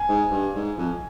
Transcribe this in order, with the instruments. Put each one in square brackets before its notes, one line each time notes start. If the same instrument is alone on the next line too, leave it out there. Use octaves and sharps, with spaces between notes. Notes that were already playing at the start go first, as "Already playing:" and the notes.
Already playing: [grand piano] G#5
[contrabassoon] G#2
G2
G#2
F2